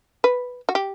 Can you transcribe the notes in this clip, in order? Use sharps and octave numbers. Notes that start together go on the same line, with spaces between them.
B4
F#4
G4